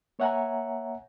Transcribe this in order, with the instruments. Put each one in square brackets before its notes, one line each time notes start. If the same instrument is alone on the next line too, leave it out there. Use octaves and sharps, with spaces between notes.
[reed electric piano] A#3 C#5 E5 F#5 G#5 A#5